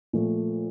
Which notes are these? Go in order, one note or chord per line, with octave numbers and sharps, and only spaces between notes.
A#2 F3 A3